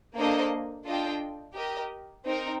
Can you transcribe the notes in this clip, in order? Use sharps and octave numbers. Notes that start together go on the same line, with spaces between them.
A#3 D4 A4 C5 D#5
D4 F4 A4 D#5 G5
G4 A#4 D#5
C4 D#4 A#4